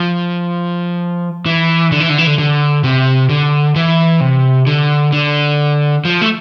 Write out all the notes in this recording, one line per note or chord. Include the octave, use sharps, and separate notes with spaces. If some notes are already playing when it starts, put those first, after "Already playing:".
Already playing: F3
E3
D3
E3
D3
E3
D3
D3
C3
D3
E3
C3
D3
D3
F3
A3